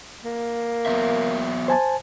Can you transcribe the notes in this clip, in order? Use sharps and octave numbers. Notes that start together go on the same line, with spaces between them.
A#3
F#3 B3 E5
C5 G#5 A5